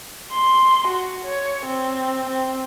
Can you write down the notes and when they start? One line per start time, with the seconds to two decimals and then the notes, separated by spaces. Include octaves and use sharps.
0.33 C6
0.88 F#4
1.25 C#5
1.66 C4
2.30 C4